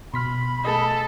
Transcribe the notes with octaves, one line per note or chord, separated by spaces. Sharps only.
B2 B5 C6 F6 B6
A3 G#4 A4 D#5